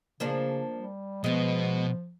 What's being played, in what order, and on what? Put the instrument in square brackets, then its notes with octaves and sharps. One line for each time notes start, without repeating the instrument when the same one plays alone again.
[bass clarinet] C#3 [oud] F3 A#3 D4
[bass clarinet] G3
[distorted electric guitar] B2 [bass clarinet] F3 [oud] G#3 B3